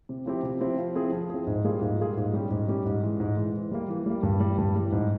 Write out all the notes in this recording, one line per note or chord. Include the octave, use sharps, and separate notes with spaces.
C3
F3 C4 E4 G4
C3
F3 C4 E4 G4
F3
C4 E4 G#4
F3
C4 E4 G#4
G#2
G3 A#3 F4 G#4
G#2
G3 A#3 F4 G#4
G#2
G3 C#4 G4
G#2
G3 C#4 G4
G#2
E3 G#3
G#2
E3 G#3
E3
G3 A#3
E3
G3 A#3
G2
E3 G3
G2
E3 G3
G#2